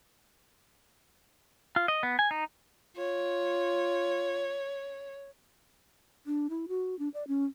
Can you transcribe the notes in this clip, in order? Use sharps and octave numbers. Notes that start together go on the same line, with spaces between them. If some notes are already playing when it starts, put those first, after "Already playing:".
F4
D#5
B3
G#5
D#4
F4 C#5
D4
E4
F#4
D4
D5
C#4